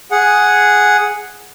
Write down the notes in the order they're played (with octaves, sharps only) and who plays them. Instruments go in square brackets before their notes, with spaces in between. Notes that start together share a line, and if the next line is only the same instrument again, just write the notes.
[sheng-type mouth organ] G#4 F#5